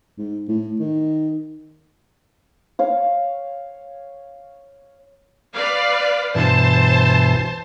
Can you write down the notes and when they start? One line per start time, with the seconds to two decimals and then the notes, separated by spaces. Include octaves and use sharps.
0.18 G#2
0.49 A2
0.80 D#3
2.79 C#5 F5
5.54 B4 D5 F5
6.35 G2 B2 E3 C5 A5